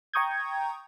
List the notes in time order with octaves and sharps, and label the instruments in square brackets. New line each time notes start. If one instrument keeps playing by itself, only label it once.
[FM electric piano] G5 A#5 C#6 D#6 G6 G#6